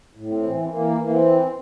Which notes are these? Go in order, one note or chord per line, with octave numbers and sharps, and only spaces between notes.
A2
C4
E3
C4
E3 A#3
E3 A#3
C4